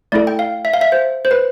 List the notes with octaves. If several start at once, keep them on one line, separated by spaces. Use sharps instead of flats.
A3 E4 A4 D5
G5
F5
E5
F5
E5
C5
C5
B4